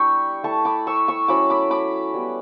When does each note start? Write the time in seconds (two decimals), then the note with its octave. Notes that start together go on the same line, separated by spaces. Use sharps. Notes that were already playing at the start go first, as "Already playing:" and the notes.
Already playing: G3 D4 E4 G5 B5 C#6 E6
0.44 A3 E4 A5 C#6
0.65 B5 D6
0.87 C#6 E6
1.08 C#6 E6
1.28 F#3 C#4 E4 B5 D6
1.50 B5 D6
1.70 B5 D6
2.14 G3 B3 E4